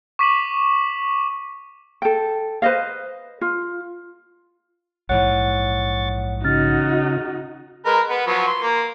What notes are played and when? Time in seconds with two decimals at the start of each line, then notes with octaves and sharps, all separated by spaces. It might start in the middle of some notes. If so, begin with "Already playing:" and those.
0.19 C#6 D6 B6 D#7 E7 F#7
2.02 A4 G5
2.62 B4 C5 D#5 F5
3.41 F4
5.09 A#1 G#2 E3 C#5 F#5 C#6 F#6 A6
6.44 C#3 D#4 F#4 F6 A6
7.85 G#3 A#4 B4
8.09 B3 B4
8.27 F3 F#3 B3
8.47 C6
8.62 A#3